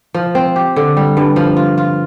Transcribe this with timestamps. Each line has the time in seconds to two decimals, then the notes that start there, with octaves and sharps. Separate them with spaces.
0.14 F3
0.35 C4
0.56 G4
0.76 D3
0.97 G3
1.17 G2
1.36 F3
1.56 F4
1.78 F4